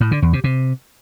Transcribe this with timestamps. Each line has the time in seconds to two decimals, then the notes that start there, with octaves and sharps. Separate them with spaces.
0.01 A2
0.11 D3
0.22 E2
0.33 C3
0.44 C3